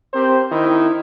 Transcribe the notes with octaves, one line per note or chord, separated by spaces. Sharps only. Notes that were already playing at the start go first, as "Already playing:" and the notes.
C4 G4 A#4 C5
D#3 D#4 E4